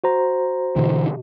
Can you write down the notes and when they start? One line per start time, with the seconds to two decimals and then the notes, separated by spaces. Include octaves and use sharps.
0.04 F#4 C5 A#5
0.76 B2 D3 E3